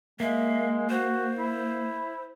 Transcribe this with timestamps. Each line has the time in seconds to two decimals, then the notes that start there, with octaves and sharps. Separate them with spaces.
0.20 G#3 A#3 E5
0.90 F#4 C5
1.38 E4